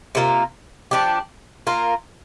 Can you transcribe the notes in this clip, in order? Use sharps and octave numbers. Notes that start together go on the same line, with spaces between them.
C3 A#3 F4 A#4
F3 D4 G4
A#3 F4 A#4